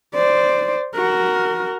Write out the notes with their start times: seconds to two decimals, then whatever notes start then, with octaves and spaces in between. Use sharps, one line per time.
0.15 C5 D5
0.95 F#4 A#4